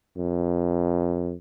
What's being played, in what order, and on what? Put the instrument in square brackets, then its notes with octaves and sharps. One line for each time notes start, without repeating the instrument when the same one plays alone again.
[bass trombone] F2